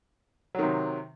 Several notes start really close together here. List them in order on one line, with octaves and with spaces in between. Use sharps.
F#3 D#3 C3